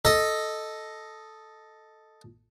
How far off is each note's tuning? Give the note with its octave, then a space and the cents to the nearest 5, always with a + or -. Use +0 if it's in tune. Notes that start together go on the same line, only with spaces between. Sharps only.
A4 +0 D#5 +0